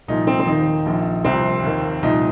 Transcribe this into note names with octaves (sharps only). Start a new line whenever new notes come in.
C2 A#2 F3 D#4
C4
C4
D#2 D#3 D#4
A#1 A#2 F3
C2 C3 F3 C4
D#2 D#3
C2 A#2 F3 D#4